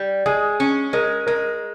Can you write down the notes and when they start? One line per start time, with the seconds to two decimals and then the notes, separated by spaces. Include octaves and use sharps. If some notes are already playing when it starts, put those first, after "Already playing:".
Already playing: G3
0.26 G#3 G#4
0.60 C#4
0.93 G#3 A#4
1.27 G#3 A#4